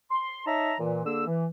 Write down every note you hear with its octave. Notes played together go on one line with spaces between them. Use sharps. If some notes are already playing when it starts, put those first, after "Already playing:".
C6
D#4 C#5 E5 A5 A#5
A#2 E3
D3 A#3 G#4 E6
E3